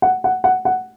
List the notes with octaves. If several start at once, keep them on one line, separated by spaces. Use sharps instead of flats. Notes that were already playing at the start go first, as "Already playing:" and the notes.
F#5
F#5
F#5
F#5